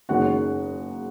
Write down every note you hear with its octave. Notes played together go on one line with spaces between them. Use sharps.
F#1 F#2 C#3 G#3 D#4 F#4 F#5